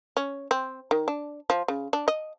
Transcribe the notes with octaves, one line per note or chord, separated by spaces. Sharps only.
C#4
C4
D#3
D4
F3
C#3
D4
D#5